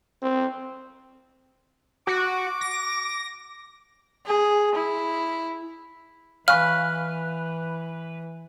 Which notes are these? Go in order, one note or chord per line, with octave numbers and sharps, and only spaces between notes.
C4
F#4 D6
A#6
G#4
E4
E3 B4 F5 G#5 C#6 F6